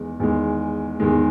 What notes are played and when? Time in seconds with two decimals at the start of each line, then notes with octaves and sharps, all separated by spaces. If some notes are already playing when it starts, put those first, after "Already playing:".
Already playing: E2 D#3 G#3
0.20 E2 D#3 G#3
1.00 E2 D#3 G#3